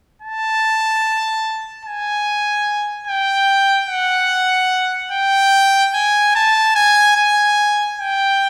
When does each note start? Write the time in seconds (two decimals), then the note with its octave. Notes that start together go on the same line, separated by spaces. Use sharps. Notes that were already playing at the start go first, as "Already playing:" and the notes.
0.22 A5
1.85 G#5
3.07 G5
3.89 F#5
5.12 G5
5.94 G#5
6.35 A5
6.75 G#5
7.16 G#5
7.98 G5